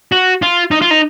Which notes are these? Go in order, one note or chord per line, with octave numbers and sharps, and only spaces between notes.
F#4
F4
D#4
F4
D#4